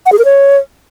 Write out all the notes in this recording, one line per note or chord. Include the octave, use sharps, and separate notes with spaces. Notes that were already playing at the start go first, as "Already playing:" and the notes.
F#5
G#4
A#4
C#5